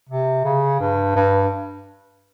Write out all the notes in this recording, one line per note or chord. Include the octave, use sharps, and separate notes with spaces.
C3
C#3
G2
G2